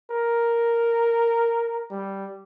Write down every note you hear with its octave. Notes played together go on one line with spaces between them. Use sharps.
A#4
G3